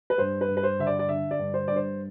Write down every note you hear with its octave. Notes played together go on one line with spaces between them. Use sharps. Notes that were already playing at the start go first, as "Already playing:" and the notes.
B4
G2 C5
B4
G2
B4
C5
D3 E5
D5
D5
D3 E5
D5
G2
C5
G2 D5
C5